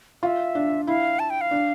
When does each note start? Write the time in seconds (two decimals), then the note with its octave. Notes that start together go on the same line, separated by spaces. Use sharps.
0.23 F4 E5
0.55 D4
0.87 E4 F5
1.19 A5
1.30 G5
1.41 F5
1.51 D4